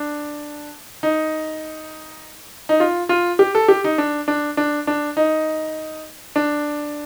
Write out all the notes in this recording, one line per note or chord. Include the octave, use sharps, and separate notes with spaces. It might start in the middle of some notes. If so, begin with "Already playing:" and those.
Already playing: D4
D#4
D#4
F4
F4
G4
A4
G4
D#4
D4
D4
D4
D4
D#4
D4